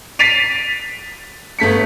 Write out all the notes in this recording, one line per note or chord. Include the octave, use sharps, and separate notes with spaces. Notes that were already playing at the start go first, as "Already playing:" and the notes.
A6 B6 C7 D7 D#7 F7
G1 A3 B6 C#7